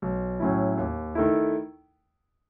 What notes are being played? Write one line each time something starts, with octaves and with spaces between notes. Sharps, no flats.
B1
A2 F#3 C#4 E4
D#2
D#3 A3 E4